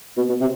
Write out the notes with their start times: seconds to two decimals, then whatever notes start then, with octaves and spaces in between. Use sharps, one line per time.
0.17 B2
0.29 B2
0.41 C3